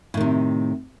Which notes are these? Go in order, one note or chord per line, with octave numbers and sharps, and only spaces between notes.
A2 C3 D#3